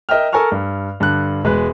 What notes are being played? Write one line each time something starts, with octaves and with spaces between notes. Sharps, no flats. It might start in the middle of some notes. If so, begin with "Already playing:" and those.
A#4 D#5 E5 G5 F6
A4 A#4 G#5 A#5 C#6 F6
G2
G2 D3 F#6
E1 G#3 B4 F#6